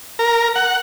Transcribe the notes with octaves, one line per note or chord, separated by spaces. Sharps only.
A#4
F#5